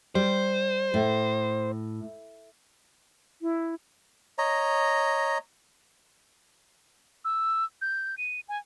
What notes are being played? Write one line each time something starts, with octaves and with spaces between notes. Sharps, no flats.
G3 C5
A2
E4
C#5 D#5 A#5
E6
G6
D#7
G#5